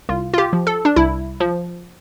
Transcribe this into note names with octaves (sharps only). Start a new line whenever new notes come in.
C2 F4
F4
G4
F3
A4
D4
C2 E4
F3